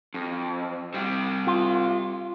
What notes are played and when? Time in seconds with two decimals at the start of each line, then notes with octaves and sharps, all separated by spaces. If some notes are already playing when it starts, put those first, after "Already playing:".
0.14 F2
0.94 C3 G3
1.47 F4